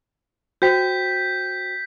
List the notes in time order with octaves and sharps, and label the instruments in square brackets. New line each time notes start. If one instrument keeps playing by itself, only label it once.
[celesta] F#4 C5 G5 [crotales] G6 B6